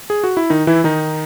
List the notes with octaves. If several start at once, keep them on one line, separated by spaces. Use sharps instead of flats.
G#4
F#4
E4
D#3 D#4
E3 E4
D#3 D#4